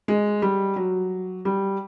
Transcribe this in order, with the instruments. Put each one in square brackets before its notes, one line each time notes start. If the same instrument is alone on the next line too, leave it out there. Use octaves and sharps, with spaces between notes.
[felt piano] G#3
G3
F#3
G3